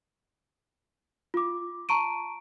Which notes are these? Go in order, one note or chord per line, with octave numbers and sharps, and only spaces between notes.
F4 D6
A5 A#5 C#6 D7 D#7